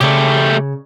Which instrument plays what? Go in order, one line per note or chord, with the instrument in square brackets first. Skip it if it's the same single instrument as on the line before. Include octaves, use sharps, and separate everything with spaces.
[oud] C#3 [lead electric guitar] A3 G4